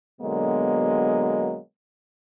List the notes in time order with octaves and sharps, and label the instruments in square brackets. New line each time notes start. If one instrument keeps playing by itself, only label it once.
[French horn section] B2 D3 F#3 G#3 A#3 B3